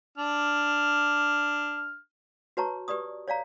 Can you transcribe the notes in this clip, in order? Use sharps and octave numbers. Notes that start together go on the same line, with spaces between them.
D4 F6
F#4 B4 C#5 A5 A#5 C#6
G4 B4 D5 C#6 D#6
C#5 D5 F5 A#5